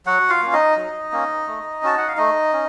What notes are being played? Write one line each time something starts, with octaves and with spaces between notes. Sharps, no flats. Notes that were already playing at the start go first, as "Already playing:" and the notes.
F#3 F#4 F#5
F4 F5
A#3 C#4
D#4 D#5
F#3
A#3 C#4
A3
C#4 F#4 A5
F#5
F5
A3 D#4 D#5
C#4